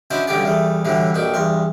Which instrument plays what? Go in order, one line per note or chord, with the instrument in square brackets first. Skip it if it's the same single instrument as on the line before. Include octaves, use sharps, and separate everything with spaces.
[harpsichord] C#4 D4 E4 F#4 C5 D#5
B1 G2 D3 C#4 G4 D5
E2 G3 A3
A2 D3 E3 F#3 G3
A#1 F2 F#4 G4
E2 G2 C6 C#6